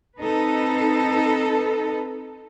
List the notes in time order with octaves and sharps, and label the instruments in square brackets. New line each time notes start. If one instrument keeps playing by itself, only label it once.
[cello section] C4 D#4 A4 B4